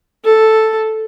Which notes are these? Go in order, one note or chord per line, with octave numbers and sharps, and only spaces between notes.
A4